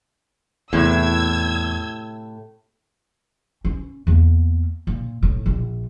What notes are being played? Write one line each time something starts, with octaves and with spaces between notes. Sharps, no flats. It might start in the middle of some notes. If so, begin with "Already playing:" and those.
E2 A2 C3 E6 G#6
C#4
E2 A#3
A#2
A2
A#1